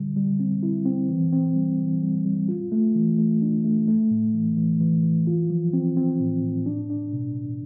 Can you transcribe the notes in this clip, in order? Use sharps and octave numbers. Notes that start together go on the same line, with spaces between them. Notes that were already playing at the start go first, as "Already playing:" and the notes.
Already playing: D3 G3
G3
C4
E4
C4
E3
C4
G3
E3
G3
G3
F4
A3
E3
A3
D4
A3
A3
A2
E3
E3
E3
E3
F4
F3
C4
C4
A2
A2
D4
D4
B2
B2